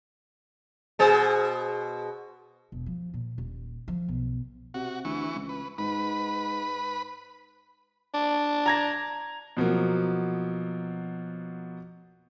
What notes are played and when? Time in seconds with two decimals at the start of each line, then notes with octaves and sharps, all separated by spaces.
0.99 B2 G#4 C5
2.72 E1
2.86 F3
3.14 A#2
3.38 D#1
3.88 F3
4.08 B1
4.74 C3 F#4
5.05 D2 E3 C#6
5.35 C#2
5.49 B4
5.78 G#2 B4 B5
8.14 D4
8.66 A#5 G#6 A#6
9.57 B2 F3 F#3 A#3